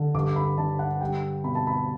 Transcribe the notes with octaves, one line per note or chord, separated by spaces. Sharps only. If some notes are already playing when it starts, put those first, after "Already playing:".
Already playing: D3
G2 D6
B5
D3 A5
F#5
G3 G5
B2 B5
A5
B5